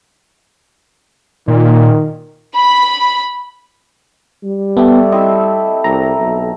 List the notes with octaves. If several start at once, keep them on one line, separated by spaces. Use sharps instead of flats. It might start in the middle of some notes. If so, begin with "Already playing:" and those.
A#2 D#3
B5
G3
A3 B3 G4 A4
C4 E4 D#5 E5
C2 A#5
B1